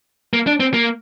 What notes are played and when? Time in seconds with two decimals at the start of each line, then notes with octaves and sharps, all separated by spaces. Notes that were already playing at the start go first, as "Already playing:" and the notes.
0.33 A#3
0.47 D4
0.60 C4
0.74 A#3